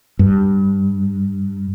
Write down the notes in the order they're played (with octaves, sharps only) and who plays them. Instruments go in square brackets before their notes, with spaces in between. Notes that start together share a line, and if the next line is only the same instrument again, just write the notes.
[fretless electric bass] G2